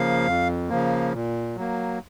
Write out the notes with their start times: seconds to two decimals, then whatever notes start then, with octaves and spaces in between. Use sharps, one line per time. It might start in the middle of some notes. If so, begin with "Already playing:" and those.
Already playing: C#3 F3 A#3 F5
0.27 F2
0.69 C#3 F3 A#3
1.13 A#2
1.56 F#3 A#3